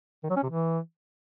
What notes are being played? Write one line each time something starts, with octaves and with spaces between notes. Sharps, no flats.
D#3
F#3
C#4
C3
E3